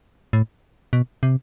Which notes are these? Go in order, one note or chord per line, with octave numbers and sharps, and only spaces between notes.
A2
B2
C3